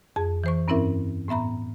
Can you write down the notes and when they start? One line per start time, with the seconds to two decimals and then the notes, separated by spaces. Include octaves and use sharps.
0.16 F2 G#4 A5
0.44 E3 C5 C#6
0.68 G2 C4 C#4 E4 A#4 E5
1.28 A2 B3 E5 A#5 B5